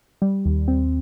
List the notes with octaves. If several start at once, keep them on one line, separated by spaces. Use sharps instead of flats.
G3
D#2
C4